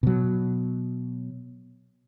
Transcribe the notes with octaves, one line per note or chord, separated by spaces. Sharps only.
B2 F#3